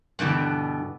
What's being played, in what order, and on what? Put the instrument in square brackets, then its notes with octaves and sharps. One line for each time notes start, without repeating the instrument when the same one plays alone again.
[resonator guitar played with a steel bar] G2 B2 D3 E3